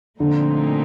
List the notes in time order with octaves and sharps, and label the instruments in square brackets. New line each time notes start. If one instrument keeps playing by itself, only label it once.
[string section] A#2 F3 A3 C4 D#4 [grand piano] D3